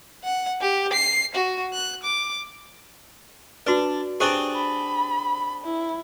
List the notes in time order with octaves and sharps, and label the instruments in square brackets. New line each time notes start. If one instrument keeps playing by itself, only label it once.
[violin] F#5
G4
C7
F#4
F#6
D6
[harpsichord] D4 [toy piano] F#4 B4
[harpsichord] C4 D4 G#4 [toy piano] G4 C5
[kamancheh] B5
E4